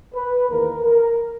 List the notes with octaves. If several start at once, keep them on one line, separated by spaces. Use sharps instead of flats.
B4
E2 D#3 A#3 A#4
A#4